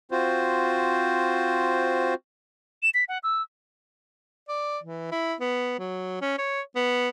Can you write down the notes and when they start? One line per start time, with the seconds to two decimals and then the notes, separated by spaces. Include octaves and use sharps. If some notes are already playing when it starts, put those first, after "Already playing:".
0.11 C4 F4 F#4 C5
2.83 E7
2.94 B6
3.08 F#5
3.23 E6
4.48 D5
4.83 E3
5.12 E4
5.41 B3
5.79 F#3
6.22 C#4
6.38 C#5
6.76 B3